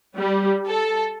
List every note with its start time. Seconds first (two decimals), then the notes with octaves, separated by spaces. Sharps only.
0.17 G3
0.68 A4